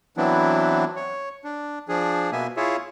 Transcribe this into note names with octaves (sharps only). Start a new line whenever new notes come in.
E3 F#3 B3 C4 D4 E4
C#5
D4
F3 D4 G#4
B2 A#3 B3 E5 G#5
E4 F4 G#4 C#5 E5